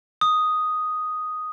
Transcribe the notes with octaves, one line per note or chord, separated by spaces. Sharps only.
D#6